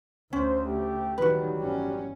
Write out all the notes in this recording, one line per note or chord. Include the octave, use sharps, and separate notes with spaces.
D2 C#4 C5
A3 G4
A1 D#3 F#3 G3 F#4 B4
G1 C#4